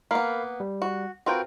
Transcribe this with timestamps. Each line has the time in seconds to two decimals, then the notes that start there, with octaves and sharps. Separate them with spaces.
0.11 A#3 B3 A#4 F5 B5
0.60 G3
0.82 F#4
1.26 C4 F4 F#4 A#4 B4 G5